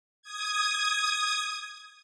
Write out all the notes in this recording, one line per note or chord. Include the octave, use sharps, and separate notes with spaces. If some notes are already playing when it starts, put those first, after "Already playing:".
D#6 G#6